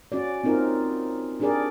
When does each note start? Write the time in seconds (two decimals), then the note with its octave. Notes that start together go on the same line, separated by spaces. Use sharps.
0.12 C#4 F#4 D5
0.44 C4 D#4 F4 A#4
1.40 D4 G4 G#4 A#4 D5